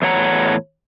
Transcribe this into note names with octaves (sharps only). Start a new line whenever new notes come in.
E2 A2 C#5 F#5 A#5